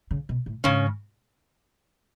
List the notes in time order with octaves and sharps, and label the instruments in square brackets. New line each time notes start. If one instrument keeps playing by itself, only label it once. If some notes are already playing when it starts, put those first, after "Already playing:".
[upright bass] C#3
B2
A2
[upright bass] G#2 [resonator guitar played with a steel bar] C#3 C#4